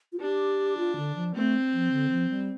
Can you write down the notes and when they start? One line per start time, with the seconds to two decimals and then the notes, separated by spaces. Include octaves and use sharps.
0.12 F4
0.20 D4 G4
0.77 F4
0.96 D3
1.16 F3
1.35 A3 C4
1.73 F3
1.91 D3
2.11 F3
2.30 G3